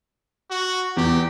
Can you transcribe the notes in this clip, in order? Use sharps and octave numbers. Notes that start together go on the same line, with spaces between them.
F#4
E2 G4